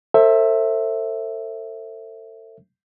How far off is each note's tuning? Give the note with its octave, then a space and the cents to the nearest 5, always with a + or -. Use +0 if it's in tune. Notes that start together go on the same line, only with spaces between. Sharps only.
A4 +40 C5 +25 E5 +0